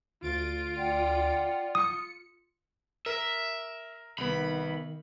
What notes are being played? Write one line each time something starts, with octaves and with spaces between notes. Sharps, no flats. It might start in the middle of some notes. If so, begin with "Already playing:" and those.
D2 F4 A6 D7
D5 F#5 G5
D#6 C#7
A#4 E5
C2 D#3 B3 B5